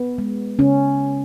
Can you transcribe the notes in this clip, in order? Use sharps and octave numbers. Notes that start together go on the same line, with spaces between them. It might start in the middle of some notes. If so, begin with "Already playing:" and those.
Already playing: B3
G#3
C#3 C#4